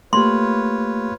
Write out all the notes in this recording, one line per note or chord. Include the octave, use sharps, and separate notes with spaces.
A3 A#3 F4 G4 B4 C#5 C6